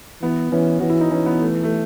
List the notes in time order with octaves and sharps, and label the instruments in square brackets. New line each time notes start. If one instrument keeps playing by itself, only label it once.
[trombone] E3 [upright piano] B3
[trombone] E3 [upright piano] C#4
[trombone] E3 [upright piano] F#4
[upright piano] E4
D#4
[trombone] E3 [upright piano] C#4
[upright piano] B3
A3
A3